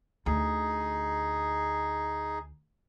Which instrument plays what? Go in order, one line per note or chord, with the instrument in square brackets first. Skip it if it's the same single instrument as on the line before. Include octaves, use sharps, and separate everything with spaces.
[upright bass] D2 [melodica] D#4 G#4